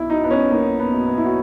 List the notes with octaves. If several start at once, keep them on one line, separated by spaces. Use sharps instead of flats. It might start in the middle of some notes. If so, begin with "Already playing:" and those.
Already playing: B1 E4
B2 F#3 D#4
B3
C#4
B1 A#3
B3
B2 F#3
B3
E4
F#4